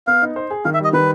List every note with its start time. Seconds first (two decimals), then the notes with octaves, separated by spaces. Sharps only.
0.07 B3 F5
0.22 D#4
0.36 C5
0.50 G#4
0.65 D#3 F5
0.74 E5
0.79 G3 D#5
0.93 D#3 B4